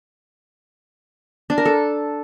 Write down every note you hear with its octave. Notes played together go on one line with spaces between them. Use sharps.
D4
A#4
A4